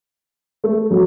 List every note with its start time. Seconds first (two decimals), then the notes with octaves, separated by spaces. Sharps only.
0.64 A3
0.91 F#3